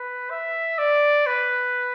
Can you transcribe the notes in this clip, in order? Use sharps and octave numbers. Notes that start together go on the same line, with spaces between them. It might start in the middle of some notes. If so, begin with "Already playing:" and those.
Already playing: B4
E5
D5
B4